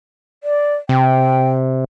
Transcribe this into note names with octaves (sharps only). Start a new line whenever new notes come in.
D5
C3 G5